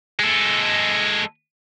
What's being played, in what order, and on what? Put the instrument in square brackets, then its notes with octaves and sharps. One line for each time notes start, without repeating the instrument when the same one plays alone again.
[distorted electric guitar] G#3 A4